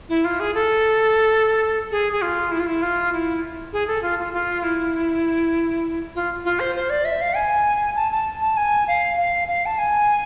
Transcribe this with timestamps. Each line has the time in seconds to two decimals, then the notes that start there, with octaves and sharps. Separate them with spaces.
0.09 E4
0.25 F4
0.40 G#4
0.54 A4
1.91 G#4
2.13 G#4
2.22 F4
2.51 E4
2.60 F4
2.67 E4
2.82 F4
3.13 E4
3.73 G#4
3.87 A4
4.03 F4
4.19 F4
4.33 F4
4.63 E4
6.15 F4
6.45 F4
6.60 C5
6.76 C5
6.90 D5
7.05 E5
7.21 F5
7.36 G#5
7.96 A5
8.12 A5
8.42 A5
8.57 G#5
8.88 F5
9.17 F5
9.48 F5
9.66 A5
9.78 G#5